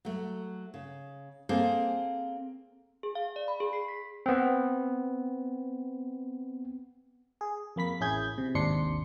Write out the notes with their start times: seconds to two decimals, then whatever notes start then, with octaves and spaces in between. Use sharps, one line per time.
0.05 F#3 A3
0.74 C#3
1.49 A#3 C4 G#4 A4 C5
3.03 G#4
3.15 F5
3.36 D5
3.48 B5
3.60 G#4
3.73 C7
3.88 B6
4.26 B3 C4
7.41 G#4
7.76 F2 A#3 B5 B6
8.00 A1 C#4 E4 G#4 G6 G#6
8.38 C3
8.55 G#1 D#2 C3 D4 C6 C#7